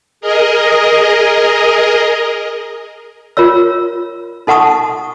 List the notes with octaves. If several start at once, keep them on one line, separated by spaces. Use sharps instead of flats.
G#4 A#4 D#5
F4 A#4 C#5 E6
D#4 A4 F#5 A5 C#6 D#6